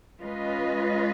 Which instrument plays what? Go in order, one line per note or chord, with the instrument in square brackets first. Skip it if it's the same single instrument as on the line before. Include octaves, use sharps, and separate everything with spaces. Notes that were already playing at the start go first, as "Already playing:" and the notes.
[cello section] G#3 C#4 F4 B4 D#5